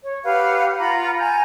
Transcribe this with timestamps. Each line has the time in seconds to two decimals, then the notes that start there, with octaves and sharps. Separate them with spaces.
0.04 C#5
0.24 G4 B4 F5 F#5
0.79 F4 F#5 A#5 B5
1.18 G#5 A#5 G6